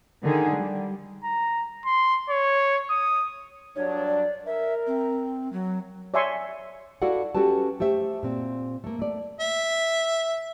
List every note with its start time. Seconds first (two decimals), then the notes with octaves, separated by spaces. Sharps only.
0.23 D3 D#3 G#4
0.57 G3
1.24 A#5
1.85 C6
2.29 C#5
2.90 D#6
3.76 G2 F#3 D4 C#5
4.07 D5
4.46 A#4 E5
4.87 C4
5.53 F#3
6.14 C#5 D5 E5 G#5 C6 C#6
7.02 E4 F#4 A4 D5 F5 F#5
7.35 C#4 F#4 G4 A4 B4 A5
7.80 A3 G4 C5 E5
8.23 A#2 C4
8.84 A3 A#3
8.99 A3 D5
9.40 E5